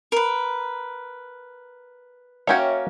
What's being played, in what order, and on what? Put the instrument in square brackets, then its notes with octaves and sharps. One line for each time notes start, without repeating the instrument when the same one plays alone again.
[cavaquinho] A#4 B4
[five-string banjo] A#3 C#4 F#4 [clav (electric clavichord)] C#5 E5 G5